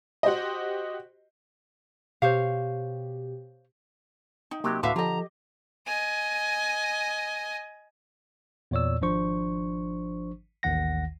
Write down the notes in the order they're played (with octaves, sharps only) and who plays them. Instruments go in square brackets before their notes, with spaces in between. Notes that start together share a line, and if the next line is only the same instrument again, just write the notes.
[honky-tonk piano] F#4 G4 C5 D#5
[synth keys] B2 G4 [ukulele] C5 C#5 F5
[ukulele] D#4 [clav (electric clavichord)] G5
[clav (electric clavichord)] C3 F#3 [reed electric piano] A#3 [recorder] G4
[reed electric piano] D2 A2 [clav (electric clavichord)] D3 [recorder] F#4 [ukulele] B4 E5 F5
[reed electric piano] F3 A4 [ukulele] G4 D#5 [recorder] A#5
[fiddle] D#5 G#5
[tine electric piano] E2 A#2 C#5 D5 E6
G#1 F3 D4 C5 C#6
A1 D#2 D#3 F#5 A#6